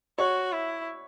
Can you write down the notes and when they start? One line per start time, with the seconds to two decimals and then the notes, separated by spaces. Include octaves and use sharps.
0.18 F#4 C#5
0.53 E4